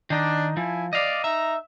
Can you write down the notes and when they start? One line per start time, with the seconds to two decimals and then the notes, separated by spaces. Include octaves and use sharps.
0.10 D#3 D4 D#4
0.57 F3 E4 G#5
0.93 D5 D#5 F5
1.24 D#4 E5 A#5